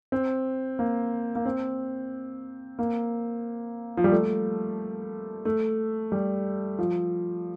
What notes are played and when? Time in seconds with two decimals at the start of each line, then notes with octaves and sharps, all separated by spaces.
0.12 C4
0.79 A#3
1.35 A#3
1.45 C4
2.79 A#3
3.97 F3
4.04 G3
4.12 A3
5.45 A3
6.12 G3
6.78 F3